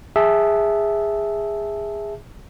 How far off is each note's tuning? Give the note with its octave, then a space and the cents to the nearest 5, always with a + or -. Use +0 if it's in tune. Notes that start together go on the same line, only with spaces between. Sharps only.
G#4 -15 E5 -5 A5 +0